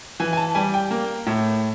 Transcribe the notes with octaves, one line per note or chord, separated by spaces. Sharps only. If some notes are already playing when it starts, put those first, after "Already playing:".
E3 G#5
G#5
A5
G3 G#5
G5
A#3
A2